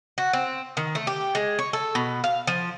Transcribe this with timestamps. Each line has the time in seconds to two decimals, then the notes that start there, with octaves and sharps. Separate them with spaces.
0.18 F#4
0.33 C4
0.77 D#3
0.95 A3
1.07 G4
1.35 G#3
1.59 C#5
1.73 A4
1.95 B2
2.24 F5
2.47 F3